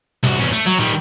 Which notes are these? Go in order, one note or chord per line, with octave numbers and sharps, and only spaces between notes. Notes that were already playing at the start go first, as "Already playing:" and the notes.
C2 F#4
E2 C#4
A3
F#3
D#3 G3